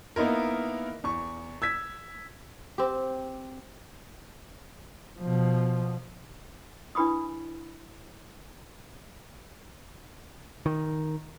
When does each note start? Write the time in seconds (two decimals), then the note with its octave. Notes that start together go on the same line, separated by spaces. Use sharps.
0.16 A#3 B3 D#4 E4 A#4
1.04 E2 C#6
1.62 E6 G#6 B6
2.78 C4 G4
5.20 B2 F3
6.95 D4 E4 B4 B5 C#6 D#6
10.66 D#3